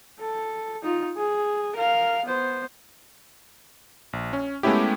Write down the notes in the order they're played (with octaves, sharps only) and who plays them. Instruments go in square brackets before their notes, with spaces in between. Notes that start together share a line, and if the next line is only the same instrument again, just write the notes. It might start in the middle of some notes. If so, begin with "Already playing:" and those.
[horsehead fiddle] A4
D#4 F4
G#4
A#4 F5
B3 C5
[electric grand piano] A#1
C#4
G#3 A3 B3 C#4 E4 G4